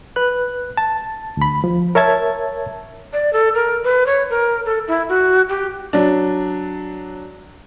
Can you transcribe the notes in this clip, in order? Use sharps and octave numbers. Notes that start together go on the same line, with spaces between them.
B4 F#6
A5
D2 B5
F3
A#4 C#5 E5 A5 G#6
D5
A4
A#4
B4
C#5
A#4
A4
E4
F#4
G4
F#3 D4